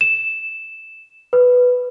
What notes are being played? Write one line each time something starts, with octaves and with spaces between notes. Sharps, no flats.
E7
B4